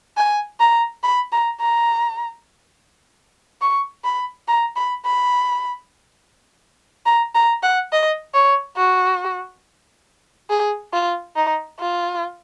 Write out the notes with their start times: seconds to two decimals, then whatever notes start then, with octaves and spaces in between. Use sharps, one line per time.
0.17 G#5
0.60 A#5
1.03 B5
1.32 A#5
1.61 A#5
3.61 C#6
4.05 B5
4.48 A#5
4.76 B5
5.05 B5
7.06 A#5
7.35 A#5
7.63 F#5
7.92 D#5
8.35 C#5
8.77 F#4
10.50 G#4
10.93 F4
11.36 D#4
11.79 F4